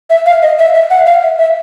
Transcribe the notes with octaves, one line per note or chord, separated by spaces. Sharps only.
E5
F5
D#5
E5
E5
F#5
F5
E5
E5